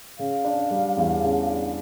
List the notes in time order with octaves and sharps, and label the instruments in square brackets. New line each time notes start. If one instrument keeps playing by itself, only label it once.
[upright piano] C#3 [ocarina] F5
[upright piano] D4
G3
E2
C#3
D4